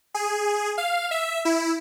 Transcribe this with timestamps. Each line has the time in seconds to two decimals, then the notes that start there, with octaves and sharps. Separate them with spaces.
0.14 G#4
0.78 F5
1.11 E5
1.45 E4